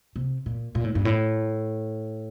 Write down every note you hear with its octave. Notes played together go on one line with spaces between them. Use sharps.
C3
A#2
A#2
A2
G2
A2